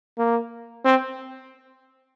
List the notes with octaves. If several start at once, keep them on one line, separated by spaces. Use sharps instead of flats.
A#3
C4